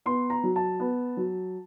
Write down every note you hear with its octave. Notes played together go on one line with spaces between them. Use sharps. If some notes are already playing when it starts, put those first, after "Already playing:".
B3 C6
A#5
F#3
A5
B3
F#3